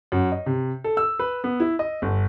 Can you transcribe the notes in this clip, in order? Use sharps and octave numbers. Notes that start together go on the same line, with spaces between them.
F#2
D#5
C3
A4
E6
B4
B3
E4
D#5
G1